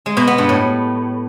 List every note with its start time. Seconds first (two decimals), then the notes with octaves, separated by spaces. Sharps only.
0.06 G#3
0.17 B2
0.27 B3
0.38 G2
0.49 A2